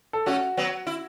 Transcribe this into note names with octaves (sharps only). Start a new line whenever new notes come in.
A4
A3 C#4 F#4
F#3 B3
E4